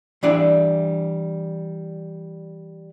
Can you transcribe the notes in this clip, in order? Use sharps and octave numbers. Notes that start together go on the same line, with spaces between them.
E3 G3 D4 E4 D5 F5